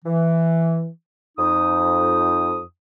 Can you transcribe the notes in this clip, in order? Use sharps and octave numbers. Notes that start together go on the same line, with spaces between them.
E3
F2 D#4 D#6